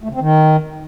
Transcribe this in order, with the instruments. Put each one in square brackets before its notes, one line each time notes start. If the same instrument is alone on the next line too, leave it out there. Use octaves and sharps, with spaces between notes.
[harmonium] A3
C#3
C4
D#3